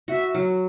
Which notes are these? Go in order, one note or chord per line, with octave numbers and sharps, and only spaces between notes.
F#4 E5
F#3